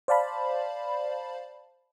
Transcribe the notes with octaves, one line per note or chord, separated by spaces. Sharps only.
C5 D5 F5 A5 B5